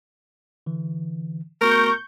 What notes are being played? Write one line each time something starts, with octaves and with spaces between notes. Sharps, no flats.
D3 E3
A3 B3 F#4 A#4 C#6 G6